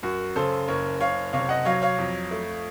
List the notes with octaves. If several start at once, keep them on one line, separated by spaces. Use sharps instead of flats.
F#2 F#4 A#4
C#3 A4 C5
F#1 A#4 C#5
F#1 C#5 F5
C3 C#5 F5
D#5 F#5
F#3 C#5 F5
C#5 F5
F2
A3